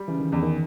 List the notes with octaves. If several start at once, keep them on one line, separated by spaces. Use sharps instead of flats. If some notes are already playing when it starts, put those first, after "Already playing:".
Already playing: G3
C#3 E3
D#3
E2 D3
D#3